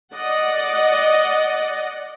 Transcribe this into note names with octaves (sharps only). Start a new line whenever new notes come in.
D5 D#5 F#5